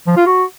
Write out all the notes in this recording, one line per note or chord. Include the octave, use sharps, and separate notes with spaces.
F3
F4
F#4